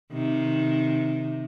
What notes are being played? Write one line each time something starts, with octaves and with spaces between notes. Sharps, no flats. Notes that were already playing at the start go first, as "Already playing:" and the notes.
C3 D#3